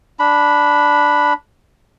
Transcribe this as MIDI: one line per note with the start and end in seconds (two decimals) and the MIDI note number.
0.19 1.33 62
0.19 1.33 83